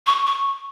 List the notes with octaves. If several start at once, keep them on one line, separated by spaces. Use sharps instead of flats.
C#6
C#6